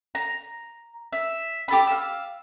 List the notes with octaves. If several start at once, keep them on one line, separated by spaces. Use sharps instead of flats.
A#5
E5
G4 A4 B5
F5 E6